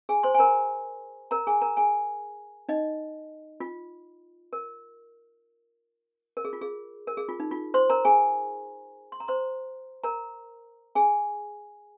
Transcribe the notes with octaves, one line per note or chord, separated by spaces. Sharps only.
G#4 G#5
C5 C6
G#5
A#4 A#5
A#4 A#5
G#4 G#5
A#4 A#5
G#4 G#5
D#4 D#5
F4
A#4
A#4
G#4
F4
G#4
A#4
G#4
F4
D#4
F4
C5 C6
A#4 A#5
G#4 G#5
C6
A#5
C5 C6
A#4 A#5
G#4 G#5